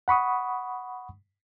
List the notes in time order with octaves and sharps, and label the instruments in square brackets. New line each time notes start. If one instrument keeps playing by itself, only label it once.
[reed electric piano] F#5 B5 C#6 D#6